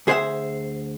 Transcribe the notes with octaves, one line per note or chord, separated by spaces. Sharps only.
D2 G#4 C5 C#5 E5 F#5